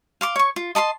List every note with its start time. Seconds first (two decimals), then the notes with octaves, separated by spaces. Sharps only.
0.21 F5 C6 D6
0.36 C#5 C#6
0.56 F4
0.75 D#5 A5 B5 C6